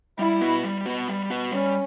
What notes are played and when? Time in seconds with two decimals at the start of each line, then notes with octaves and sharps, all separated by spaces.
0.19 G3 E4
0.41 B3 F#4 B4
0.63 G3
0.86 B3 F#4 B4
1.08 G3
1.30 B3 F#4 B4
1.52 G3 C#4